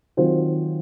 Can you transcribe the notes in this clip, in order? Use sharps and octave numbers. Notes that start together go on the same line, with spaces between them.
D#3 F#3 C4 F4 C5